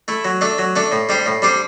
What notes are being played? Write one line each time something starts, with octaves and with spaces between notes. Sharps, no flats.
A3 E4
F#3
A3 D4 A4
F#3
A3 D4 A4
A2
G3 D4 G4 C5
A2
G3 D4 G4 C5